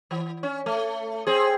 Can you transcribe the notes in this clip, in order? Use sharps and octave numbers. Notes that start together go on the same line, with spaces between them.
E3
C#4
A3
C4 G#4